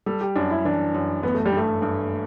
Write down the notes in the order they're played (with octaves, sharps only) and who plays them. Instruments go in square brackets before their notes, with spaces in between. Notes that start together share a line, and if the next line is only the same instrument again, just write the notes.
[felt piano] G3 [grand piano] A4
[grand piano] G4
[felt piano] F#2 [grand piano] D4
[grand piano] E4
[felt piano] E3 [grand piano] D4
[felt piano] F#2
[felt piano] A1 [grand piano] B3
[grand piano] A3
G3
[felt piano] G2 [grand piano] A3
[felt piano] G2